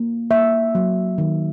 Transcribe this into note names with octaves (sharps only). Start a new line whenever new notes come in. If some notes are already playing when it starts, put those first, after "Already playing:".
Already playing: A#3
A#3 E5
F#3
D#3